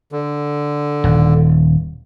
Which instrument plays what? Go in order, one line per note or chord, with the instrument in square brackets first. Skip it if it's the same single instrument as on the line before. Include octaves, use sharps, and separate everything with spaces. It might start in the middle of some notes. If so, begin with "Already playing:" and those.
[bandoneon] D3
[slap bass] D#1